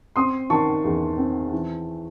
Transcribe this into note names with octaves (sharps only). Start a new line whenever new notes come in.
C4 C6 D#6
D#3 A5 C#6
E2
C4
E3